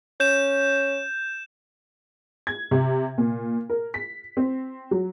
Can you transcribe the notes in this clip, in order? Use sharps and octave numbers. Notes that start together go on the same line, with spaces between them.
C#4 G6 E7
G#6
C3
A#2
A#4
B6
C4
F#3